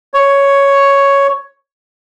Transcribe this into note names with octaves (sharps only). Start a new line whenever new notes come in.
C#5